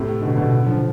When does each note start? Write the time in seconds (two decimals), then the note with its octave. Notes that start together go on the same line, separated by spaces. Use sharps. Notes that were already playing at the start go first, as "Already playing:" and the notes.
Already playing: A2 C3
0.22 B2 D3
0.36 B2 D3
0.66 D3 F3